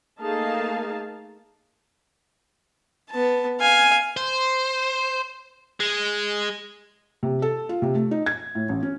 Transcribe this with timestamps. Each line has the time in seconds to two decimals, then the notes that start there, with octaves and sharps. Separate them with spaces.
0.20 A3 A#3 D#4 G#4 F5 A5
3.10 B3 A5
3.60 F5 G#5
4.17 C5
5.80 G#3
7.23 C3
7.42 A4
7.69 F4
7.82 C3
7.95 A3
8.11 D#4
8.26 G#6
8.55 A2
8.69 A1
8.83 C#4